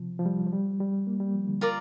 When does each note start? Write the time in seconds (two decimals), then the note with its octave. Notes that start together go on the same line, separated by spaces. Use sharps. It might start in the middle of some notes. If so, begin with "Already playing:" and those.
Already playing: C3 F3
0.19 F3
0.26 G3
0.46 F3
0.53 G3
0.80 G3
1.07 A#3
1.20 G3
1.34 F3
1.48 D3
1.61 F4 A#4 D5